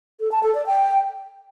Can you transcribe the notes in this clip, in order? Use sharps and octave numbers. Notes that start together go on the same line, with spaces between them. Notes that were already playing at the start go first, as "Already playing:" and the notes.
A4
A5
A4
D5
G5